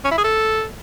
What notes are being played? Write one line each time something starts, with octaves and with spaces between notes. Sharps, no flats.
C#4
E4
G#4
A4